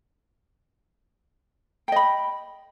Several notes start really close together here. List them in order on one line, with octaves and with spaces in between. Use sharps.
G5 D#5 B5